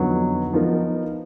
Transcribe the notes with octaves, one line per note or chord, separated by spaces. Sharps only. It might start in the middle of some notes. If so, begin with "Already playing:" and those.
Already playing: F2 D3 F#3 B3 D#4
F3 B3 D#4 A#4